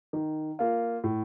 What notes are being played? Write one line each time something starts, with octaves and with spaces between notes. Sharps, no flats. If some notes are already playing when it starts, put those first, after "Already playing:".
D#3
A#3 F4
A2